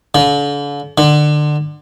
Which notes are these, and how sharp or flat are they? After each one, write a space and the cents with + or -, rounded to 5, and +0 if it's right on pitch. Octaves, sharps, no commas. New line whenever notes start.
D3 -40
D3 +25